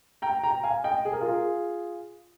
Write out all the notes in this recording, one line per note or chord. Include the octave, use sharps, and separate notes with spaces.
G5 A#5
G5 A#5
F5 G#5
D#5 G5
G#4
A#4
F4 G#4